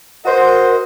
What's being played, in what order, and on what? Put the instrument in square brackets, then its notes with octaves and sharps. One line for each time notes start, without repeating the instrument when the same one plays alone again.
[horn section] F#4 C5 D#5 [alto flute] A#4